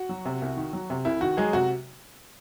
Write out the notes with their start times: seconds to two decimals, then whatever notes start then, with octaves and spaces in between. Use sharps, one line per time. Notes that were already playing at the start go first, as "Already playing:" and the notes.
Already playing: F#4
0.09 F#3
0.25 C3
0.42 C2
0.57 D#3
0.73 F#3
0.90 C3
1.05 C2 E4
1.21 D#3 F#4
1.37 F#3 G#3 G#4
1.53 C3 F#4